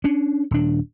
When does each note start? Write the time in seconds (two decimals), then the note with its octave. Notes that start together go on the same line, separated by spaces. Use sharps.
0.04 C#4 D4
0.51 D#1 D4